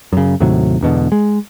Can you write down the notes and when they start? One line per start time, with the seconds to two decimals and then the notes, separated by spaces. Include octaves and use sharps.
0.13 F#2 C#3
0.40 D#2 A2 C3 F#3
0.81 E1 E2 B2 D3
1.12 G#3